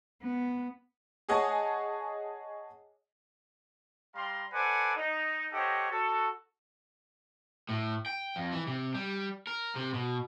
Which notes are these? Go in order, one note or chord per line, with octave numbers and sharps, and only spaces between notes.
B3
G#4 C#5 D#5 F#5 G#5 A5
G3 F5 A#5 C6
A4 B4 C5 D5 F#5 G#5
D#4
G4 A4 C5 C#5 D#5 F#5
F#4 A4
A2
G5
F2
E3
C3
G3
A#4
C3
B2